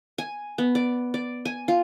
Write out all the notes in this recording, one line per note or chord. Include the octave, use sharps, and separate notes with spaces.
G#5
B3
D5
D5
G#5
F4